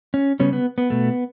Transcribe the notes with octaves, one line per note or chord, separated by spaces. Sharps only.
C#4
C#3 G3 B3 C#4
B3
B3
B2 A3